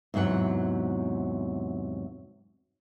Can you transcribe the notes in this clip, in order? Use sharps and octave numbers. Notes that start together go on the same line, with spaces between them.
E2 G#2 C3 F#3 F#5